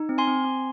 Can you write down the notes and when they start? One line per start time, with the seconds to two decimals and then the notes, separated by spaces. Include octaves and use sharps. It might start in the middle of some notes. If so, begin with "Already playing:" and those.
Already playing: D#4
0.09 C4
0.18 G#5 C6
0.28 C4
0.45 C4